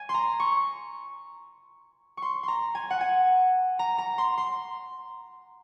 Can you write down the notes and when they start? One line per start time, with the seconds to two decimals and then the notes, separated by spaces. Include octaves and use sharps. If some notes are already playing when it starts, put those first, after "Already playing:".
Already playing: G#5
0.09 C6
0.14 A#5
0.40 C#6
2.17 C6 C#6
2.43 A#5 C6
2.75 G#5
2.90 F#5
3.01 G#5
3.79 A#5
3.98 A#5
4.18 C6
4.38 C6